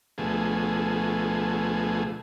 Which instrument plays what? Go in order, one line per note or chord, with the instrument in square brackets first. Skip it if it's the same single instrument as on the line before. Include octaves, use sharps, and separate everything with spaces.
[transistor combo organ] D2 B2 F3 A3 G#4